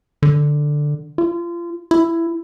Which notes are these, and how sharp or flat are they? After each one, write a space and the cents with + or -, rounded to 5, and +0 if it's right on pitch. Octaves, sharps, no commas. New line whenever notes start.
D3 +5
F4 -30
E4 +15